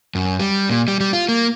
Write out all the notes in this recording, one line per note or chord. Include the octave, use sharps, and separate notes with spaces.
F#2
G3
A#2
G3
G3
F4
A#3